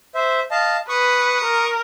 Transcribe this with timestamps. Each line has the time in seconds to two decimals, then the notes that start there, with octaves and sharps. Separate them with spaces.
0.15 C5 E5
0.51 D#5 F5 A5
0.89 B4 C#6 D#6
1.44 A#4